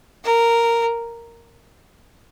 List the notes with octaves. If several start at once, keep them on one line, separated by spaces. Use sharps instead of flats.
A#4